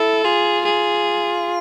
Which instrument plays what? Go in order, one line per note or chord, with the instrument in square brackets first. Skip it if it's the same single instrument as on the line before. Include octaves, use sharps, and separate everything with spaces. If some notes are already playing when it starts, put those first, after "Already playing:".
Already playing: [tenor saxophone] E4 [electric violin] A4
[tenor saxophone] F4 [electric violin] G#4
[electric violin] G#4